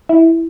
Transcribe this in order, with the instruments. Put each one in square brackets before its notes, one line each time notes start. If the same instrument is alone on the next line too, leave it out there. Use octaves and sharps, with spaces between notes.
[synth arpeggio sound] E4